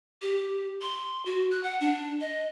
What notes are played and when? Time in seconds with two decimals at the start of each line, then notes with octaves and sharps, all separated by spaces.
0.22 G4
0.81 C6
1.26 F#4
1.51 F#6
1.63 F#5
1.81 D4
2.21 D#5